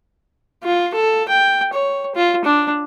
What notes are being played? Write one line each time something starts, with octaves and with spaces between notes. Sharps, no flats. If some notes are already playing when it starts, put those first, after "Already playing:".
F4
A4
G5
C#5
F4
D4